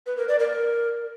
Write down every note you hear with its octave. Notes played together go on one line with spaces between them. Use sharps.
B4
A#4
D5
A#4